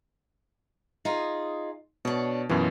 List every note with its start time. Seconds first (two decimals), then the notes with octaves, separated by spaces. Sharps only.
1.05 D#4 F4 G#4
2.05 B2 D4 C#5
2.49 F#2 B2 E3 F4